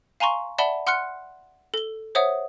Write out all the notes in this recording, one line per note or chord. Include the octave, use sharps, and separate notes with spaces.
F5 G#5 A#5 C6 C#6
D5 E5 F#5 A5 B5 G7
F#5 C6 F6 F#6 C#7
A4 G7
C5 C#5 E5 F#5 D#6